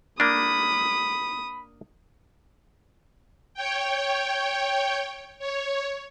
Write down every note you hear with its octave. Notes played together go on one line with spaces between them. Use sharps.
A#3 D4 B5 D#6
C#5 G5
C#5